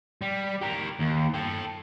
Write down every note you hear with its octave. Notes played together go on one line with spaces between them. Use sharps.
G3
G4 A#4
D#2
A4 G5